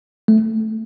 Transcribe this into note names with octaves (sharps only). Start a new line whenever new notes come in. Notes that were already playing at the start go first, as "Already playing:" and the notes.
A3